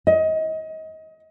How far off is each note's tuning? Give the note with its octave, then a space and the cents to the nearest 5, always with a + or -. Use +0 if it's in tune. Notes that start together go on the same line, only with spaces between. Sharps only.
D#5 +30